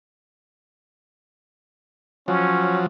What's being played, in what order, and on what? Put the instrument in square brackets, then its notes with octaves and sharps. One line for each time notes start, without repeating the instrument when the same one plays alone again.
[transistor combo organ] F3 F#3 [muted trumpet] C#4